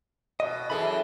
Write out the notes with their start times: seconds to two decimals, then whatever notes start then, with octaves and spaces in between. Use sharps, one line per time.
0.40 B2 D#5
0.70 F#2 E3 G#4 A4 B5